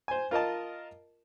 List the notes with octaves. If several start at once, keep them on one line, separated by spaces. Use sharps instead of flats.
C5 G#5
F4 A#4 D#5 A5